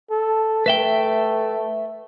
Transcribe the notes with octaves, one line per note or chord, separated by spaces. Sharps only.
A4
A3 B4 E5 G5